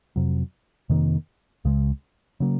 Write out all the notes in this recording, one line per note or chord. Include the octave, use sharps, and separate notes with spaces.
F2 C3 F#3
F2 C3 D#3 A#3
C#2 C#3 G#3
C#3 F#3 A#3